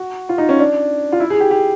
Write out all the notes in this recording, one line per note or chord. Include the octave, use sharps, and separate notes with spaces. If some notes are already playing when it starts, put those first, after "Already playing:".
Already playing: F#4
F4
D#4
C#4
D4
F4
E4
G#4
G4
G4